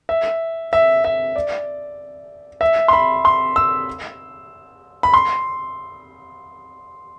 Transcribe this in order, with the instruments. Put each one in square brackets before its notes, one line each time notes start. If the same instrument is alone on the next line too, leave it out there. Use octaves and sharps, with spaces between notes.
[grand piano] E5
E5
E5
D5
E5
C6
B5
C6
E6
B5
C6